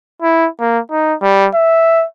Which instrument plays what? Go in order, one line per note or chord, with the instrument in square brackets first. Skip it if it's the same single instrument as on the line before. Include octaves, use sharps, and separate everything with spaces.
[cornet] E4
A#3
D#4
G3
E5